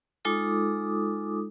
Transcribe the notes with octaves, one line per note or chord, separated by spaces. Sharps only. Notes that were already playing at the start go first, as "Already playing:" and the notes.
G#3 D#4 F4 A4 D6 D#6